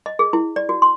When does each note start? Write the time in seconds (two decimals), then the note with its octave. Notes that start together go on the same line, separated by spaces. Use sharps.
0.06 D#5
0.19 G#4
0.33 E4
0.56 D5
0.69 F#4
0.82 C6